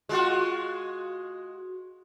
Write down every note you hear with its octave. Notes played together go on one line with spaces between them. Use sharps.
G#3 F4 F#4